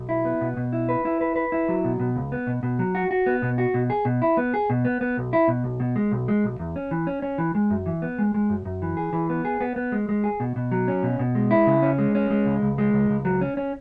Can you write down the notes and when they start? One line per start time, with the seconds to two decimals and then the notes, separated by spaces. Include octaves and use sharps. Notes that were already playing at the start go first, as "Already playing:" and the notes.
Already playing: B1
0.09 E4
0.25 B3
0.41 B2
0.57 B2
0.73 E4
0.89 B4
1.05 E4
1.21 B4
1.36 B4
1.52 E4
1.69 F#3
1.84 B2
2.00 B2
2.16 C#2
2.32 B3
2.47 B2
2.63 B2
2.79 F#3
2.95 F#4
3.11 F#4
3.26 B3
3.42 B2
3.58 F#4
3.74 B2
3.90 G#4
4.05 B2
4.22 E4
4.37 B3
4.54 G#4
4.70 B2
4.85 B3
5.01 B3
5.17 B1
5.33 E4
5.48 B2
5.64 B1
5.80 B2
5.96 G#3
6.12 B1
6.28 G#3
6.44 B1
6.59 E2
6.76 C#4
6.91 E3
7.07 C#4
7.22 C#4
7.38 E3
7.55 G#3
7.70 F#2
7.86 E3
8.02 B3
8.19 G#3
8.34 G#3
8.50 F#2
8.65 F#2
8.82 E3
8.97 G#4
9.13 E3
9.30 B3
9.45 G#4
9.61 B3
9.76 B3
9.92 G#3
10.09 G#3
10.24 G#4
10.40 B2
10.56 B2
10.71 F#3
10.88 C#4
11.03 B2
11.19 B2
11.35 G#3
11.51 E4
11.67 C#3
11.82 C#4
11.98 G#3
12.15 C#4
12.30 G#3
12.46 C#2
12.62 C#2
12.78 G#3
12.93 C#2
13.09 C#2
13.25 F#3
13.41 C#4
13.57 C#4